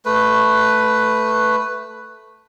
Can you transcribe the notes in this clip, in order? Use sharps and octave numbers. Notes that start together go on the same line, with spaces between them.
A3 B4